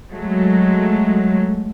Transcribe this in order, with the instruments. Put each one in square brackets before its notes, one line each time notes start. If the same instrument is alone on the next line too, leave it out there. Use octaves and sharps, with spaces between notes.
[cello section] F#3 G#3 A3